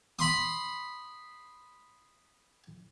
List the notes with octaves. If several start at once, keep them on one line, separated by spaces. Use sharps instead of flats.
B5 C6 D#6